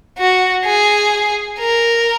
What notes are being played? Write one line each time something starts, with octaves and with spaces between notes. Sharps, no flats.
F#4
G#4
A#4